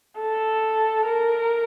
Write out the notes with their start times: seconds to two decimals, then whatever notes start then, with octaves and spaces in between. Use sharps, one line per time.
0.20 A4
1.07 A#4